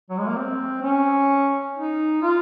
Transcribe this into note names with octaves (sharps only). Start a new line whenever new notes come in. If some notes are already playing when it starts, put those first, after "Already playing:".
F#3
G#3
A#3
C4
C#4
D#4
F4